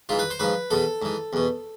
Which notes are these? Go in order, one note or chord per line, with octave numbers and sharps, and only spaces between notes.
G#2 E3 F4
B4
C5
G#2 F3 B4
E2 B2 A4
G#2 E3
E2 B2